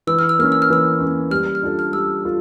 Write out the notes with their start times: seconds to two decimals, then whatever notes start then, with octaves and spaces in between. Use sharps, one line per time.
0.07 E3 E6
0.19 F6
0.29 E6
0.39 A#3 C#4 F6
0.52 E6
0.62 F6
0.70 E3 E6
1.00 A#3 C#4
1.31 G3 F6
1.55 F6
1.63 D4 F4 A4
1.79 F6
1.92 G3 E6
2.24 F4 A4